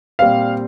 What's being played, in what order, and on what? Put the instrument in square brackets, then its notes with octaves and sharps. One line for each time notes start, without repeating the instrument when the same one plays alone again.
[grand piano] A#2 G3 C4 F5